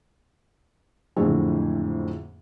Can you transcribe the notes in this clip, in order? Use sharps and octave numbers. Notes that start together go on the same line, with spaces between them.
F#1 F2 A2 D3 C4 G#4